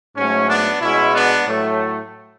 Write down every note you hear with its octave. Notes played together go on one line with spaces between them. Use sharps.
G#2 F#3 A3 C#4
B3 D4
B2 G#3 C#4 E4
B3 D4
A2 F#3 A3